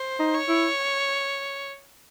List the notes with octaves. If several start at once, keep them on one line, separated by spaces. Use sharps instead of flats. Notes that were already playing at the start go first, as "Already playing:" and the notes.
Already playing: C5
D#4
C#5
E4